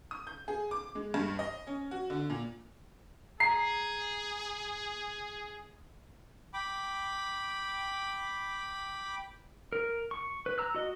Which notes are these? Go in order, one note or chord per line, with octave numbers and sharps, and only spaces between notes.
D#6
G6
G#4
D6
G#3
G2
D#5
C#4
F#4
D3
A#2
G#4 A#5 C7
G5 B5 D6
A#4
C#6
B4
A#5 E6 F#6
F#4 D#5